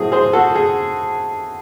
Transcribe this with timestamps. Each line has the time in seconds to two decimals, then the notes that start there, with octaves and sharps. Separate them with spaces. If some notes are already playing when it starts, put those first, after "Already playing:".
Already playing: A2 F#3 C4 G#4
0.12 G#4 C5
0.33 F#4 A4
0.55 G#4